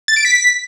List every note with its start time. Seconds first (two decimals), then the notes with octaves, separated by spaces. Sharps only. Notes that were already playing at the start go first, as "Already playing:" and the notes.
0.08 A6
0.16 D7
0.25 B6